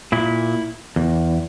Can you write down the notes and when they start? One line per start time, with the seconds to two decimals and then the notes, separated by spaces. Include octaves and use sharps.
0.12 A#2 E4
0.96 E2